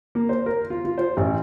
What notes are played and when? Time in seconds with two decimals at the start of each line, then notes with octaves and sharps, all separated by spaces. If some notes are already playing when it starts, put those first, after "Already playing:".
0.15 A#3
0.29 C5
0.46 A#4
0.70 F4
0.85 F4
0.98 C5
1.17 A1